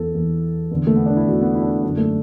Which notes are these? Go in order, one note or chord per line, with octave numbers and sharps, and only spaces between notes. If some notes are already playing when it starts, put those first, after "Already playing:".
Already playing: E2 E3 A4
E2 E3
E2 D3
A3
B3
D4
E4
E2 D3 F#4
B3
E4
D4
E4
F#2 D3 D4
A3